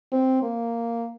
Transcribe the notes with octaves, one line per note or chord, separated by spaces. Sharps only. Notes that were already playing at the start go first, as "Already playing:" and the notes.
C4
A#3